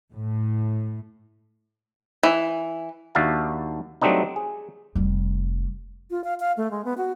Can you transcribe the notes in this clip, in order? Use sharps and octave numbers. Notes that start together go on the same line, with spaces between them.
A2
E3
D#2 D4 F#4 E5 F5 A5
F#3 G3 A3 C4 D4 D#4
G#4
F1 G3
F4
F5
F5
A3
G#3
B3
F#4